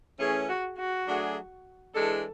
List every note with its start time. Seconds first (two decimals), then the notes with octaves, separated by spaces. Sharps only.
0.20 E3 A3 C#4 G#4
0.49 F#4
0.78 F#4
1.07 F#3 A3 D4 G#4
1.95 E3 G#3 D4 A4